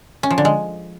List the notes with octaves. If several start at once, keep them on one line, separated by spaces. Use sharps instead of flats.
C#4
F3
D3
G#3